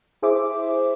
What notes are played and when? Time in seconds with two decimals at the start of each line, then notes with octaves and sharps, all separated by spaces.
0.22 E4 G#4 C5 E5 D6